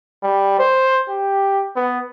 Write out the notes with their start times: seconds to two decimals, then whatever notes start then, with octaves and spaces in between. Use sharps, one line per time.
0.23 G3
0.59 C5
1.09 G4
1.76 B3